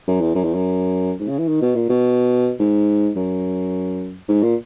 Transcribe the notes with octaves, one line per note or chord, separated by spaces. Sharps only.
F#2
E2
F#2
E2
F#2
G#2
C#3
E3
D#3
B2
A#2
B2
G#2
F#2
G#2
A#2